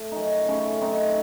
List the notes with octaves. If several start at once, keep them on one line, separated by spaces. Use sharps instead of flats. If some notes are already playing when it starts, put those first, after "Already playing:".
Already playing: A3
F#2 C#4 D#4
C#3 A3 C#4
F#2 C4 D#4